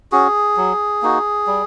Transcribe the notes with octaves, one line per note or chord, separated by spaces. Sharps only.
C#4 F#4 G#4
F#3
A#3 D#4 F#4
G3